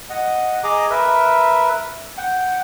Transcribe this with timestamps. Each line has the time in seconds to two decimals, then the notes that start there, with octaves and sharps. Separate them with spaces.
0.10 D#5 F#5
0.64 G#4 D#5 A#5 D6
0.90 A#4 B4 E5
2.18 F#5 G5